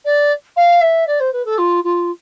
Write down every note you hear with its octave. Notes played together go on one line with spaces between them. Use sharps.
D5
F5
E5
D5
C5
B4
A4
F4
F4